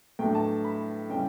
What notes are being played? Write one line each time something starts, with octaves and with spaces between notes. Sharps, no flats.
A2 F#3 A3 D4 G5
A5
B5
C#3 G3 C#4 E4 G5